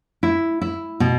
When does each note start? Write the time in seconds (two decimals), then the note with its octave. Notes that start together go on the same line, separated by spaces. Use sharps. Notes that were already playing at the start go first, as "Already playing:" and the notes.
0.23 E4
0.61 E4
1.00 B2